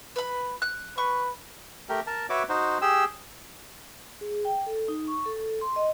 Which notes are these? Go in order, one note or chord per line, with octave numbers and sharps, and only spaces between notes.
B4 B5
F#6
B4 C#6
A3 G4 A#4
A#4 A5
F#4 B4 C#5 E5 D6
D#4 F#4 C5
G4 G#4 E6
G#4
G5
A4
D#4
C#6
A4
C6
D#5